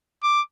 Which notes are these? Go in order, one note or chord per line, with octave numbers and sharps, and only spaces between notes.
D6